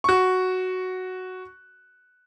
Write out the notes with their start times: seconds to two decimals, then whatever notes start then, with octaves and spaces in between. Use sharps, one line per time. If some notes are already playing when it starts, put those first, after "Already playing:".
0.04 F#4 C#6